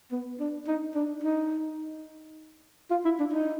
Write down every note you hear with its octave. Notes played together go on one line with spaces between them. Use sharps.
B3
D4
D#4
D4
D#4
F4
E4
D4
D#4